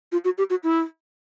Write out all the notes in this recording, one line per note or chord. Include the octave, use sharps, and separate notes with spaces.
F4
F#4
G4
F#4
E4